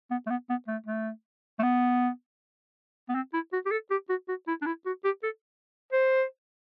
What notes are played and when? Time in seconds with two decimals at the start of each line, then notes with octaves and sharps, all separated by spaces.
0.11 B3
0.27 A3
0.30 B3
0.50 B3
0.68 A3
0.87 A3
1.59 A3
1.63 B3
3.09 B3
3.15 C4
3.33 E4
3.53 F#4
3.66 G4
3.71 A4
3.91 G4
4.09 F#4
4.29 F#4
4.48 E4
4.62 D4
4.66 E4
4.86 F#4
5.04 G4
5.23 A4
5.93 C5